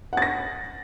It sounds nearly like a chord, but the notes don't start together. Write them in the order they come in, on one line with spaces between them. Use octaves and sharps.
F#5 A6 A#6